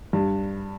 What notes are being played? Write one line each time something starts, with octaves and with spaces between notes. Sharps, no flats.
G2 G3